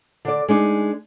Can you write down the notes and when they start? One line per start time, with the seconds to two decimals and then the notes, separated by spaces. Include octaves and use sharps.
0.25 D3 D5
0.48 G#3 D4 D#4